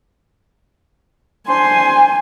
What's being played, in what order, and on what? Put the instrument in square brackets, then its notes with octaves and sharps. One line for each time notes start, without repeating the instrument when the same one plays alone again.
[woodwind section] D4 C5 C6 [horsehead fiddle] G#5